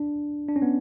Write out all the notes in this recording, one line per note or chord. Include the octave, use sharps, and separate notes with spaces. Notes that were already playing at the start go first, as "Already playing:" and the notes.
Already playing: D4
D4
C#4
B3